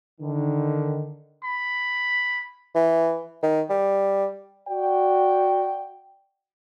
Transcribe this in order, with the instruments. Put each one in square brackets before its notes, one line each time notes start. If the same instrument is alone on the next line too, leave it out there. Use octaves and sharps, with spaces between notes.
[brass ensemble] D3 D#3
[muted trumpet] B5
[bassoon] E3
D#3
G3
[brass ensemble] F#4 D5 G5